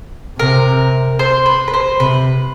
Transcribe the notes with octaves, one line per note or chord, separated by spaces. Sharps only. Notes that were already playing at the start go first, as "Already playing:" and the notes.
C3 A#4
C5
B4
B4
C5
C3 B4